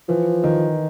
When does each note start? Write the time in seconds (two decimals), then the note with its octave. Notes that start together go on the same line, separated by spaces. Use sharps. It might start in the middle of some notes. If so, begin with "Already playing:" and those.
0.09 E3 F3
0.44 D#3